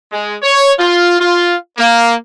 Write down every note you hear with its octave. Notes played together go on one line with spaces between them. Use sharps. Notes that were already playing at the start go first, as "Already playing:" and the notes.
G#3
C#5
F4
F4
A#3